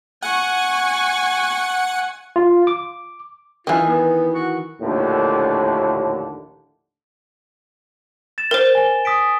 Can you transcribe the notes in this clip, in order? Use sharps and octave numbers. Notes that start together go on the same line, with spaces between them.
F#5 G#5 C#6
F4
D6
D#3 E3 F4
B3
F#4
A#1 D#2 A2 D3
A6 E7
A#4 C5
G#5 G7
D#6 B6 D7